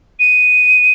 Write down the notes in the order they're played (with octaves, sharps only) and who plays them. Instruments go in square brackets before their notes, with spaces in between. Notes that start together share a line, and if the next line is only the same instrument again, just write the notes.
[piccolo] D#7